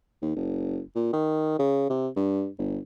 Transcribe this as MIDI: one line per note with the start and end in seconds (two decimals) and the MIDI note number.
0.22 0.33 39
0.36 0.80 30
0.95 1.12 46
1.13 1.57 51
1.59 1.85 49
1.89 2.08 48
2.16 2.48 43
2.58 2.79 31